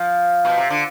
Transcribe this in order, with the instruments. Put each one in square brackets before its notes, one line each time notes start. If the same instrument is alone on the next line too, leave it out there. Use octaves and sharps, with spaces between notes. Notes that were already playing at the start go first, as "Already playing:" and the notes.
Already playing: [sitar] F3
B2
C3
D3